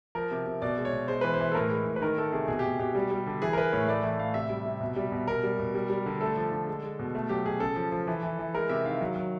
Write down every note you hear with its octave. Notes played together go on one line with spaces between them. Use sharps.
F3 A#4
C3
C3
B2 D5
G#3
C#5
B2
G#3 C5
E3 B4
C5
E3
A4
A2 A#4
G#3
A2
B4
D#3 A#4
A3 A4
C3 G#4
B2 G#4
G4
B2
B2 G4
G3
G3
D3
E3 G#4
A#4
E3 B4
A2 C#5
A3 D5
E3
A2 F5
C3 E5
G3
C3
B2
G3
B2
B2 A#4
G3
B2
G3
G3
D3
A3 A4
F3
D3
G#3
G#3
B2
A3
F#3 G4
B2 G#4
C#3 A4
F3
F3
E3
E3
E3
G#3 A#4
C3 E5
D#3 F5
F#3
F#3